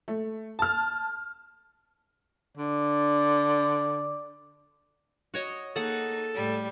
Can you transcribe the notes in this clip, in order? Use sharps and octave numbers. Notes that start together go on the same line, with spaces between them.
A3
A5 F6
D3 D5
F#4 C#5 D#5
A#3 D#4 G#4 A4 F#5
A2 G3